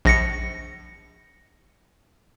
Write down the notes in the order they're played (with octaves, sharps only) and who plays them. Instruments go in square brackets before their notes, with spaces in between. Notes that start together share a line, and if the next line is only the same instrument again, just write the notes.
[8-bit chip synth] A#1 A#6 C#7